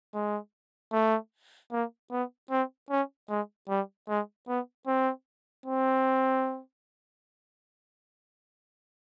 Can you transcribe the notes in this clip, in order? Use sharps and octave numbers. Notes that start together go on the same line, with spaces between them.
G#3
A3
A#3
B3
C4
C#4
G#3
G3
G#3
B3
C4
C4